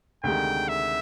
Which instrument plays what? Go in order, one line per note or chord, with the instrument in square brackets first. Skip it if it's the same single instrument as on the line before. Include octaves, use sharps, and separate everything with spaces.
[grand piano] D2 C3 D#3 G#3 [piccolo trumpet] G5
[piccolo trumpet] E5